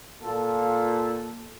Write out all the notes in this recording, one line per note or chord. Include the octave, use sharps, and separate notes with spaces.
A#2 F4 A4